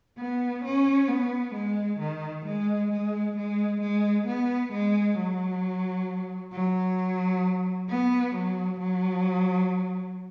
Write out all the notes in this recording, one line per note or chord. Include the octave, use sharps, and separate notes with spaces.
B3
C#4
B3
G#3
D#3
G#3
G#3
G#3
G#3
B3
G#3
F#3
F#3
B3
F#3
F#3